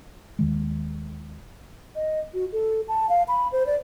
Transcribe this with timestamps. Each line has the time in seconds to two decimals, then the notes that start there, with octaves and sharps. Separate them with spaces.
0.39 D#2 D#3 G#3
1.95 D#5
2.34 F#4
2.52 A4
2.88 A5
3.09 F5
3.28 B5
3.52 C5
3.66 D5